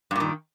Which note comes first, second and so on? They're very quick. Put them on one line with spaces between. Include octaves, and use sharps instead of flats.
G2 A#2 D#3